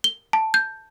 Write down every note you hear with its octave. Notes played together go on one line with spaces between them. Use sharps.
G7
A5
G6